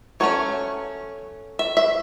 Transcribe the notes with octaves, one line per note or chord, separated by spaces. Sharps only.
F#3 A3 C#4 C#5
E5
E5